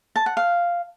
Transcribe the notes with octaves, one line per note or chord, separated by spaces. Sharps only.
A5
F#5
F5